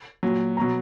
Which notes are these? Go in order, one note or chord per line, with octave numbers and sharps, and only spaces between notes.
A#2 F#3
B2 F#3 A#5